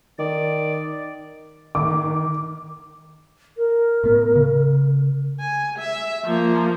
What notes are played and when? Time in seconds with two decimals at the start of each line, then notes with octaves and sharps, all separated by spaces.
0.19 D#3 D5
1.75 D#3 D6
3.57 A#4
4.04 A2 B3
4.36 C#3
5.40 G#5
5.79 E5
6.25 F3 A#3